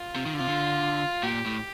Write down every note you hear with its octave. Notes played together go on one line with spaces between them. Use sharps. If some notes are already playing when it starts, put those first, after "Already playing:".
Already playing: F4
C3
D#3
D3
C3 F4
D3
A#2 G4
A2